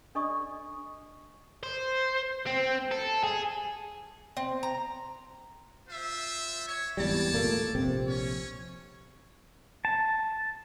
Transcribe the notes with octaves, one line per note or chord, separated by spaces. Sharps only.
D4 A4 D5 D#5 C#6 D#6
C5
C4
A4
G#4
C4
A#5
F4 C5 E5
C#5
G#1 E2 G3 C#5 D5 A5
A#2 A3 A#3
A#1 C3 C4
C#4 C#5
A5